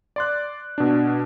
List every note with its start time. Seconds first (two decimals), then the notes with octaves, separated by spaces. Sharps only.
0.16 D5 C6 F#6
0.78 B2 D4